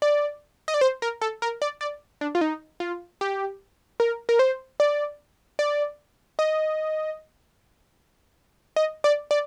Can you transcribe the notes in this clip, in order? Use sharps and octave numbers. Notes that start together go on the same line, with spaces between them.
D5
D#5
D5
C5
A#4
A4
A#4
D5
D5
D4
F4
D#4
F4
G4
A#4
A#4
C5
D5
D5
D#5
D#5
D5
D5